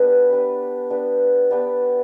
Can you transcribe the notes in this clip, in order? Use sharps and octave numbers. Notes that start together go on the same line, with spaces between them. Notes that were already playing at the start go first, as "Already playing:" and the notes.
Already playing: B3 D4 G4 B4
B3 D4 G4 B4
B3 D4 G4 B4
B3 D4 G4 B4